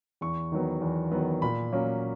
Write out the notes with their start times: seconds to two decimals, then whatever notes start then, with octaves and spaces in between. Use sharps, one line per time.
0.21 E2 C#6
0.52 D#3 F#3 B3
0.81 E2
1.12 D#3 F#3 B3
1.42 A#2 B5
1.72 F#3 A#3 C#4